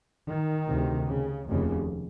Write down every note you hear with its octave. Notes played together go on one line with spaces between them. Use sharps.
D#3
D2 C3
C#3
F1 D#2 C#3